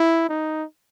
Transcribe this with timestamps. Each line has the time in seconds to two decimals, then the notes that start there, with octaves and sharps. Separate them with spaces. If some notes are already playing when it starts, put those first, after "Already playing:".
Already playing: E4
0.29 D#4